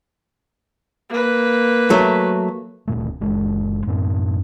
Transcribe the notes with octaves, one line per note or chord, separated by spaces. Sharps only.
A#3 B4
F#3 A3
D1 A#2 A3
F#1 G#3 D4
F#2 A2 C4